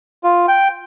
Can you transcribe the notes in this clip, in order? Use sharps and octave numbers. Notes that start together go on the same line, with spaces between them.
F4
G5